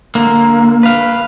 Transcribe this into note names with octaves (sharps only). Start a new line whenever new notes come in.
D3 A#3
B4 F5